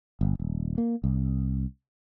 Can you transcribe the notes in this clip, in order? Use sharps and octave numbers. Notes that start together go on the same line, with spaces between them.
G1
D#1
A#3
C2